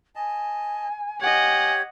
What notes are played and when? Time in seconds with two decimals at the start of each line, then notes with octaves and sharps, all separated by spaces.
0.15 D#5 G#5 A5
1.21 G4 C#5 D#5 F#5 G#5